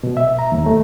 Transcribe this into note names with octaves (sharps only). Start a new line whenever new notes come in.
B2
E5
A#5
D#2
A3